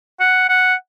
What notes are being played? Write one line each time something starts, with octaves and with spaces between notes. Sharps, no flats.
F#5
F#5